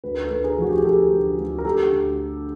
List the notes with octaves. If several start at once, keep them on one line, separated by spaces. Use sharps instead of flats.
D2 B4
A#4
A4 B4
D2
G#4 A#4
F3 F#4
G4
G#4
D3 G4 A4
D2
D2
A#4
D2 G4 A4
D2